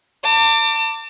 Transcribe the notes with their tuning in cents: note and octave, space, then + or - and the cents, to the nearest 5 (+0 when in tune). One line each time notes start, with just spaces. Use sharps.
A5 +40 D6 +0